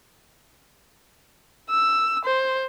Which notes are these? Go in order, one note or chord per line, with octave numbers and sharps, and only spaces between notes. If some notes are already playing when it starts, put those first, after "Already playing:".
E6
C5